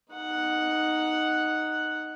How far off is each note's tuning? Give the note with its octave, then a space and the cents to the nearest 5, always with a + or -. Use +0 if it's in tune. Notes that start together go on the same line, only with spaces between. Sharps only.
D#4 +0 F#5 +0